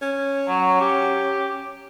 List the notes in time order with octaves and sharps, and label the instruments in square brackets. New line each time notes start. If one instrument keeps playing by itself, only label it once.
[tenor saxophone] C#4
[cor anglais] F#3
G4